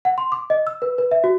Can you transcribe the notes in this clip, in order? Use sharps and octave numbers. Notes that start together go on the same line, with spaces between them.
F#5
C6
D6
D#5
E6
B4
B4
E5
F#4